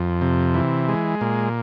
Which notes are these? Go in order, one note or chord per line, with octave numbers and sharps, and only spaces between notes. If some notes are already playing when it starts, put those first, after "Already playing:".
Already playing: F2
C3
E3
G#3
A#2